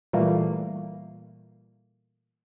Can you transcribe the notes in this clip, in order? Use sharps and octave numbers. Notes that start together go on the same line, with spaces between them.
A#2 E3 G3 A3 A#3